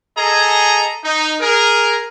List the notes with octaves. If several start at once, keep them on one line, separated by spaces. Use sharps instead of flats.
G#4 A4 D#5 G#5 A#5
D#4
G#4 A#4